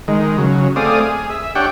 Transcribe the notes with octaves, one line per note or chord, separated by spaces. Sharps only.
D#3 G#3
C#3 F#3
A3 C4 G#4 D5 F5 D#6
G#4
E5
D4 G4 C#5 F#5 G5